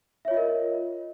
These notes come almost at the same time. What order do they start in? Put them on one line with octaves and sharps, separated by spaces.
E5 C#5 F4 D#5 A#4